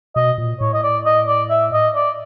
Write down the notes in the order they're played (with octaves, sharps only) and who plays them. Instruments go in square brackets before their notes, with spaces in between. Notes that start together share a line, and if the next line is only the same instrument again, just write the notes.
[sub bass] B2 [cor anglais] D#5
[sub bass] A#2
[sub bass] A2 [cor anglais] C#5
[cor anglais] D#5
D5
D#5
D5
E5
D#5
D5